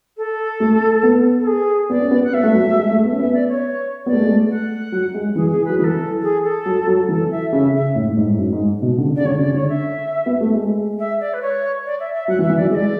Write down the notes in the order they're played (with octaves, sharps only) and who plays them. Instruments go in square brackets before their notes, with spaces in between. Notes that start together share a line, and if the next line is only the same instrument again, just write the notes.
[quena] A4
[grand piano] A3
B3
[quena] A4
G#4
[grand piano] B3 [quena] D5
[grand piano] C#4
B3
[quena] F#5
[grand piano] B3 [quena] E5
[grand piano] A3
F#3
F#3
G#3
A3
B3
C#4
[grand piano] B3 [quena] E5
[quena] D5
C#5
[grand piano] B3 [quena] D5
[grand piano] A3
G#3
A3
[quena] F#5
[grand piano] F#3
G#3
[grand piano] E3 [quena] G#4
[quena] G#4
[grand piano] F#3 [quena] B4
[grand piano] E3 [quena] B4
[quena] A4
G#4
A4
[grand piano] F#3
F#3
[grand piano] E3 [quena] A4
[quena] E5
[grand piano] C#3 [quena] E5
[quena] E5
[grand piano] A2
A2
G#2
G#2
F#2
G#2
B2
D3
C#3
[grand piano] C#3 [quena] D5
[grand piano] D3 [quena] C#5
[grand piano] C#3 [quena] D5
[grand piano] D3 [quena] C#5
[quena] E5
[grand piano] B3
A3
G#3
[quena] E5
D5
B4
C#5
D5
E5
E5
[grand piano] F#3 [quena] F#5
[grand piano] E3
[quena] E5
[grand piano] E3
[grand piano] F#3 [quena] D5
[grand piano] G#3 [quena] E5
[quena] D5